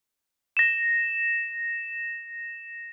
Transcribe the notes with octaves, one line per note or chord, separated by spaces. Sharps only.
A#6 E7